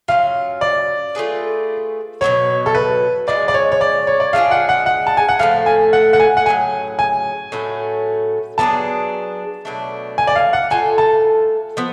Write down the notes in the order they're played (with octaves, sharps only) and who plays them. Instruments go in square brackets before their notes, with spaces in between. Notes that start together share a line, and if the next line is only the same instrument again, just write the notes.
[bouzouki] F#3 C#4 F4 [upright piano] F5
[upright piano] D5
[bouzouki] A3 F4 G#4 B4
[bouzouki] B2 F#3 B3 F#4 [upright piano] C#5
[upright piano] A4
B4
[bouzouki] F3 G#3 C#4 G#4 [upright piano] D5
[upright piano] D5
C#5
C#5
D5
C#5
D5
[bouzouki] G#3 D4 F4 G#4 [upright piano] F5
[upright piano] F#5
F#5
F#5
A5
G#5
F#5
[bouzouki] A2 F3 A3 [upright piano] F5
[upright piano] G#5
F#5
F#5
G#5
F#5
[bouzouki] A2 F#3 C#4 G#4 [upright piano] G#5
[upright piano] G#5
[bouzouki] A2 F#3 A3 C#4
[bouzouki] F#3 B3 D4 G#4 [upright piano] A5
[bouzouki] B2 F#3 A3 D4
[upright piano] G#5
D5
F5
F#5
[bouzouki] A3 F4 A4 [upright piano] G#5
[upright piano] A5
[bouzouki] F3 B3